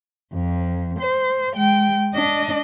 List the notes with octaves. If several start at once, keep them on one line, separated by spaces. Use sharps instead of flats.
F2
C5
G#3 G5
D4 D#5